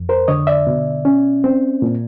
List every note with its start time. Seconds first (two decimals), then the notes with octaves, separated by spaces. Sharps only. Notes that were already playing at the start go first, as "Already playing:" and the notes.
Already playing: F2
0.09 A#4 C5
0.28 D3 C#5 D#5
0.47 D5 E5
0.67 B2
1.05 C#4
1.44 C4
1.82 A#2